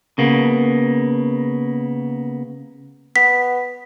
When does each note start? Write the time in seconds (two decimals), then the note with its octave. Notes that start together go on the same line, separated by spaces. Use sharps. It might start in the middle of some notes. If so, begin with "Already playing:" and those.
0.18 C#3 A#3 B3
3.16 B3 B6